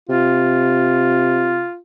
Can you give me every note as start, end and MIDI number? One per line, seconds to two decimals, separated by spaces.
0.09 1.65 48
0.09 1.77 65